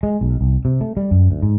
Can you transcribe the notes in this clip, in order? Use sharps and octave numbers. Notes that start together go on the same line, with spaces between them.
G#3
B1
C2
C3
A3
G3
F#2
D2
G#2